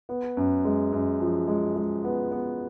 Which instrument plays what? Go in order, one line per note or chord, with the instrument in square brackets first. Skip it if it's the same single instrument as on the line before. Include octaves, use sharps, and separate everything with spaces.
[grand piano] B3
F#2
G#3
F#2
F3
G#3
G#3
B3
B3